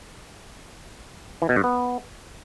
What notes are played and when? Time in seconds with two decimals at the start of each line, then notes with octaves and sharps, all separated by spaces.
1.42 E3
1.49 B2
1.56 G2
1.64 B3